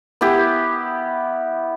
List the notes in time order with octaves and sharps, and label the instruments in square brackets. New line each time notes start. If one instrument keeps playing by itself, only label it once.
[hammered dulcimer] B3 E4 G4